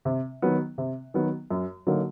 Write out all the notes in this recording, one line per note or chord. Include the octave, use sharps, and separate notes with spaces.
C3
D#3 F#3 B3
C3
D#3 F#3 B3
F#2
D3 F#3 A#3 D#4